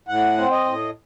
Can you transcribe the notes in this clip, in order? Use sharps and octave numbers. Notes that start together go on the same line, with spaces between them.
A2 F#5
C4
D#5
A2